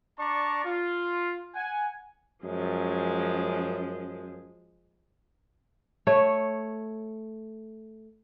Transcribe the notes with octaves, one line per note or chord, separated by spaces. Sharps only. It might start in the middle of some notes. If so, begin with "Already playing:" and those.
D4 D5 A5 A#5 C#6
F4
F#5 G#5
F#2 F3 G#3
A3 C#5